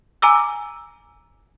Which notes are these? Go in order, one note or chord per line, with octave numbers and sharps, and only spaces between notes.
G#5 A#5 D6 E6